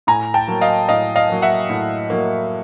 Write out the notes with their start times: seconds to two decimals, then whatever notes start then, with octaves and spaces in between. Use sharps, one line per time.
0.07 A2 G#5 A#5
0.34 G5 A5
0.48 F#3 A#3
0.61 D#5 F5
0.89 A2 D#5 F5
1.16 D#5 F5
1.29 F#3 A#3
1.42 E5 F#5
1.70 A2
2.10 F#3 A#3